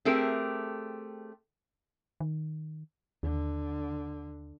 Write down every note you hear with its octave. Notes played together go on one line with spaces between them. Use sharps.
A3 C4 G4 G#4 A#4
D#3
D#2 D3